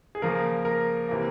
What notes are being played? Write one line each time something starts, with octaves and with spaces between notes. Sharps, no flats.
G#4
C#3 F3 A#3 A#4
A#4
C3 E3 A#3